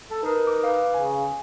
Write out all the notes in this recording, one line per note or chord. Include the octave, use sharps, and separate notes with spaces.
A4
D#4 A#4 B4
D6
B4 F5
C#3 G#5